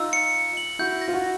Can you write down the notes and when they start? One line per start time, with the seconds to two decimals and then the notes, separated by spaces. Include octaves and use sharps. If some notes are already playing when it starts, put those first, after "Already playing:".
Already playing: D#4 F4 E6
0.13 C#7
0.35 C#7
0.57 F#7
0.79 E4 F#4 G6
1.01 A#6
1.08 F4
1.13 E4 F#4